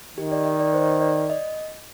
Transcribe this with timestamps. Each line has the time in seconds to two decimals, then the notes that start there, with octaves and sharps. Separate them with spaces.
0.18 D#3 G4
0.32 D5
0.45 D#5
0.60 D5
0.74 C5
1.01 D5
1.30 D#5